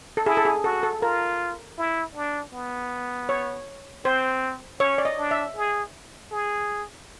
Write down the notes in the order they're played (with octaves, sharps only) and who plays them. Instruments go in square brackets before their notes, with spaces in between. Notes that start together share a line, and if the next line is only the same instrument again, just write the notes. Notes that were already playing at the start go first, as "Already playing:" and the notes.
[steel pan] A4
[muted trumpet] E4 [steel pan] G#4
[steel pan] A4
G#4
[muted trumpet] F#4 [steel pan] A4
[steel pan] A4
[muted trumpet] F4 [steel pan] A#4
[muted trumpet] E4
D4
B3
[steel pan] C#5
[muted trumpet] C4 [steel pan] C5
[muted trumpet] C#4 [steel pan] C#5
[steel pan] D5
D#5
[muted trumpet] D4
[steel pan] E5
[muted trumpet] G#4
G#4